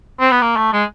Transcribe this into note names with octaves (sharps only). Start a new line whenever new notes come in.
C4
B3
A#3
A3
G#3